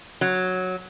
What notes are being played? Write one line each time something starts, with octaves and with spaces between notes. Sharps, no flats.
F#3